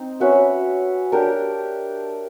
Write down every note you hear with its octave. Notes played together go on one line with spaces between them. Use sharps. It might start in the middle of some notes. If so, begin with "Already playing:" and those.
Already playing: C4 D#4
C#4 F#4 B4 E5
D4 G4 A#4